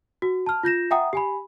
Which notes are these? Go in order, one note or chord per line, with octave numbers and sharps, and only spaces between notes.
F#4
A5 F6
F4 G6 A#6 E7
E5 F#5 G5 A#5 D#6
G4 G#5 B5